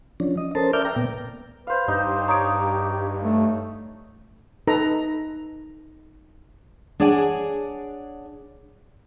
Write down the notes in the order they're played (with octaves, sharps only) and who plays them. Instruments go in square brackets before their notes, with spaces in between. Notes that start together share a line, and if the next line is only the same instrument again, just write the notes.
[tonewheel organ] F3 C#4 D4
D#5
C#4 A4 A#4 C5 A5
A#4 D5 E5 D6 F6 G6
G5 A#5
A#2 B3
[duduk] B4 [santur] C5 F5
[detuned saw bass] G2 [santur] D#4 [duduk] G4
[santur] C#5 [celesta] A#5 D#6 D7
[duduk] A3
[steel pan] D#4 A4 B4 A#5
[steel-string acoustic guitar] D4 G#4 C#5 D5 F#5 G#5